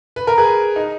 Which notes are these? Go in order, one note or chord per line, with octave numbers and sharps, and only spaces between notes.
B4
A#4
G#4 B4
D#4